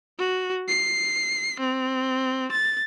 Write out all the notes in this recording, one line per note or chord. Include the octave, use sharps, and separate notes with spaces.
F#4
C7
C4
A6